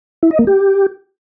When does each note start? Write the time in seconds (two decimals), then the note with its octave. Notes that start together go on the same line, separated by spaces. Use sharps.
0.23 E4
0.31 D#5
0.39 A#3
0.47 G4